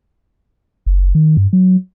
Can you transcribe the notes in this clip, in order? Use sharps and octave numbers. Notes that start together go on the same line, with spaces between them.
F#1
D#3
G2
F#3